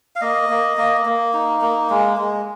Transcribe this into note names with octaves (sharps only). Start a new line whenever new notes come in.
F5
A#3 D#5
A#3
A#3
A#3
D#4
A#3
G#3
G#3